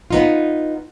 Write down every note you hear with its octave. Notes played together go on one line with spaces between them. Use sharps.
B3 D#4 F4